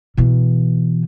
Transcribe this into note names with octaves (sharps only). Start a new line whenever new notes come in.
B2 E3